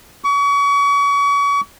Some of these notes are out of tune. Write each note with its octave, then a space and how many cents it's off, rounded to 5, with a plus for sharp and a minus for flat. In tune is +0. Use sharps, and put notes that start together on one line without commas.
C#6 +35